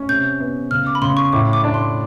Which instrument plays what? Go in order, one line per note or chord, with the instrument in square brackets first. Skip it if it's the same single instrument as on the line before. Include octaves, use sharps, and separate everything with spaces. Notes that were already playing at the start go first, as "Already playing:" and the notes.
Already playing: [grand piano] C#4
[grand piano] C3 [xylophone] G6
[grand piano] B3
[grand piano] C#3 [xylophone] F6
[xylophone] D6
B5
[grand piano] C#3 [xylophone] C6
[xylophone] C#6
[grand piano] A2 [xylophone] D6
[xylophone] D6
[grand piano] D4
[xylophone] C6